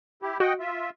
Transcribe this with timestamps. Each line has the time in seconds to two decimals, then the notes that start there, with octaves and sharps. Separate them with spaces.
0.22 E4 G4
0.40 F#4 D#5 F#5 G5
0.60 F4 E5